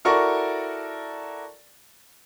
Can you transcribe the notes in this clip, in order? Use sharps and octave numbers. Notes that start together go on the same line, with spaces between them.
E4 F#4 A4 A#4 D5 C#6